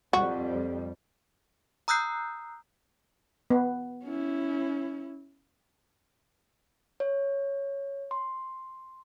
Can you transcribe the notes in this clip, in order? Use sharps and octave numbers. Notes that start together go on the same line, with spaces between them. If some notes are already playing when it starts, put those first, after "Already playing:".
F2 G3 F#4
A#5 D#6 E6 F#6 G6 C7
B3
C#4 E4
C#5
C6